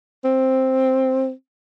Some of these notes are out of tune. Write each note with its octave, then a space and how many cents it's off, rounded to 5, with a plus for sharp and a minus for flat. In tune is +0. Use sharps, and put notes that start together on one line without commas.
C4 +5